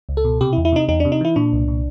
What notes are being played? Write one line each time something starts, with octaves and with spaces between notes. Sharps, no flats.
C#2
A4
B2
C3 G4
E4
E2
E4
C3 D#4
E2 D#4
C3 D4
D#4
E3 E4
A#2 D4
C2
A#2